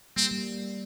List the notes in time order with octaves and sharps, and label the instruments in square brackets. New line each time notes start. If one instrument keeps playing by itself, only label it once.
[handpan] G3 A#3 [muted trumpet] C4
[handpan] G3 A#3